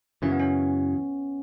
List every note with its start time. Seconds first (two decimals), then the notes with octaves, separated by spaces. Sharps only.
0.22 F#2 C#3 E3 C#4
0.31 B3
0.40 C#4